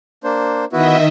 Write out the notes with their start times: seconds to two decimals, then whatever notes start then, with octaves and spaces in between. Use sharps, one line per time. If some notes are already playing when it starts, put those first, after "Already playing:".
0.24 A#3 D4 C5
0.72 D#3 B3 E4 F#4 D#5 E5